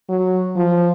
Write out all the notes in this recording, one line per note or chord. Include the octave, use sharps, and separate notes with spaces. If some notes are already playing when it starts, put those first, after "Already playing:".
F#3
F3